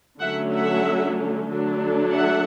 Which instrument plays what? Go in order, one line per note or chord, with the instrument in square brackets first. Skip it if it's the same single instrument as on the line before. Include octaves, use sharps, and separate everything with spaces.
[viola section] D3 F#3 A3 C#4 E5 F#5
E5 F#5
D3 F#3 A3 D4
E5 F#5